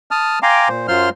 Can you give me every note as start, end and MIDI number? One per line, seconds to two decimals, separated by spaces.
0.11 0.39 81
0.11 0.39 87
0.11 0.39 89
0.43 0.68 77
0.43 0.68 79
0.43 0.68 80
0.43 0.68 82
0.43 0.68 84
0.43 0.68 86
0.68 0.87 46
0.68 0.87 72
0.88 1.09 42
0.88 1.09 54
0.88 1.09 65
0.88 1.09 72
0.88 1.09 84
0.88 1.09 89